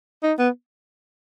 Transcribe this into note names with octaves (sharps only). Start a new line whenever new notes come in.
D#4
B3